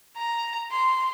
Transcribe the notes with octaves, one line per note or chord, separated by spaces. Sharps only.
A#5
C6